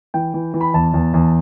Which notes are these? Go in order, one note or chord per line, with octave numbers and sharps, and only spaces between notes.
E3 G5
E3
E3
B5
E2 A5
E2
E2